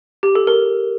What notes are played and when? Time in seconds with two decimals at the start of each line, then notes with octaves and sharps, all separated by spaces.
0.23 G4
0.35 A4
0.47 A#4